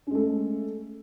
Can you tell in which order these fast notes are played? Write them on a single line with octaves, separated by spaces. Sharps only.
C#4 G#3 A3